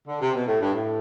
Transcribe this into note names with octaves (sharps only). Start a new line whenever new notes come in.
D3
C3
B2
A2
G2
A2